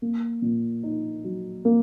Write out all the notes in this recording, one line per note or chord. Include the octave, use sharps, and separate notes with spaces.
A#3
A#2
D#4
F#3
A#3